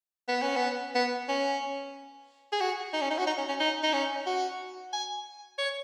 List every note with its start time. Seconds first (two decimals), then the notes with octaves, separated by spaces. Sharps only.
0.28 B3
0.42 C#4
0.56 B3
0.95 B3
1.28 C#4
2.52 G#4
2.61 F#4
2.93 D#4
3.01 C#4
3.10 D#4
3.18 F#4
3.27 D#4
3.38 C#4
3.49 C#4
3.60 D#4
3.83 D#4
3.93 C#4
4.26 F#4
4.93 G#5
5.58 C#5